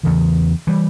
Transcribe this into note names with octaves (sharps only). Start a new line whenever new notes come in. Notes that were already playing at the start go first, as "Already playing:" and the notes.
E2 C#3 E3
E3 G3